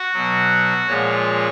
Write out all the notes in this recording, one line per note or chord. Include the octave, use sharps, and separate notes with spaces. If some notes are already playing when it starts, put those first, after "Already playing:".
Already playing: F#4
B2 F#3
A#2 F3 G#3 C#5